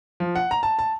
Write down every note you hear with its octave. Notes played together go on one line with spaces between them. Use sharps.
F3
F#5
A#5
A5
A5